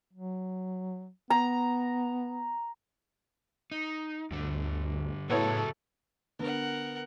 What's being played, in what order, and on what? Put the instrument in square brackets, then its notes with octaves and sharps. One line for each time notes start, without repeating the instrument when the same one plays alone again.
[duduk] F#3
[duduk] B3 [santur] A#5
[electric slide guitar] D#4
[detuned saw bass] D2 [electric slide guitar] G2 D3
[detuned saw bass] A2 [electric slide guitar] C#3 F#4 G#4 [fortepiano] B3 E4 C#5 [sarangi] A4
[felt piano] D3 B3 [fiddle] A#4 F#5